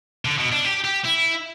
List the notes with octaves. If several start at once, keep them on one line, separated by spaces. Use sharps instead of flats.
D3
B2
D4
G4
G4
E4